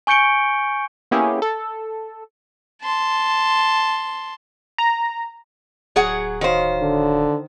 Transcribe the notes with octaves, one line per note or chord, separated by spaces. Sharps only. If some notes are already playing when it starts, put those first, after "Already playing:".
G#5 C#6 G6 C#7 D7 G7
A#3 B3 C#4 E4 G4 G#4
A4
A5 C6
A#5
D1 F#3 G#4 F#5
D#3 F#4 C5 C#5 F5
D3